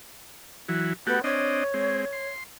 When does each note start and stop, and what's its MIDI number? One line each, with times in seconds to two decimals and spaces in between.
0.69 0.93 52
0.69 0.93 54
1.07 1.20 57
1.07 1.22 59
1.07 1.20 66
1.07 1.20 67
1.24 1.64 60
1.24 1.64 62
1.24 2.29 73
1.24 1.64 75
1.74 2.05 56
1.74 2.05 60
2.13 2.44 84